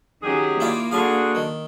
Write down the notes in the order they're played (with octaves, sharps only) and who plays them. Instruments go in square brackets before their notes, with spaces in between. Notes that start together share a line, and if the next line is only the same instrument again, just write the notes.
[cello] D#3 C#4 [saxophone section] F#3 G4 G#4
[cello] A#3 [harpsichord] E4 F4 D5
[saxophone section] D3 F#4 G#4 [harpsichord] F5 G#5
[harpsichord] D#3